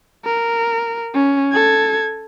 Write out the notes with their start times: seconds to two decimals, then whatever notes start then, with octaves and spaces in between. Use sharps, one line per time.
0.25 A#4
1.14 C#4
1.52 A4 G#6